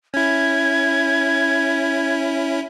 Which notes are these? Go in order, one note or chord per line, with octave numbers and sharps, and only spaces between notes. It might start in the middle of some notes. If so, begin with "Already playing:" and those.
C#4 E4 G#6